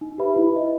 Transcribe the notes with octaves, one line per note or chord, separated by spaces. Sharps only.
D#4
G4 B4 E5 B5
E4
B4 D#5